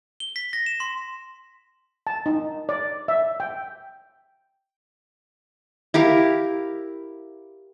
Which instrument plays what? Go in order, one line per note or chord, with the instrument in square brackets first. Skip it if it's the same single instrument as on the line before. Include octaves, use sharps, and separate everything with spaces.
[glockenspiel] G7
B6
A#6
E7
C6
[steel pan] A5
D#4
D5
E5
G5
[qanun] E4 G4 A#4 F5